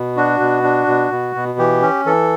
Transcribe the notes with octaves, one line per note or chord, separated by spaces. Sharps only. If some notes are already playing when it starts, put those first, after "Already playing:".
Already playing: B2
D4 F#4
B2
D4
B2
B2
B2
E3 G4
C#4
E3 A4